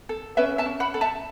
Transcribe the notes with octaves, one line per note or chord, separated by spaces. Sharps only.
A4
C#4 B4 E5
E5 A5
C#4
F#5 B5
A4
E5 A5